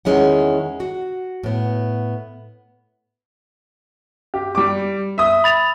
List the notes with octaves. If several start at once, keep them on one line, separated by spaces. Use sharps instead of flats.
E2 D#3 G#3 C#4 E4 F#5
F#4
A2 B3
G4
G3 D6
E5 D#6
B5 A6 F7